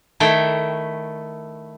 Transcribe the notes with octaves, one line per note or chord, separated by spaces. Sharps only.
D#3 A3 E4 G5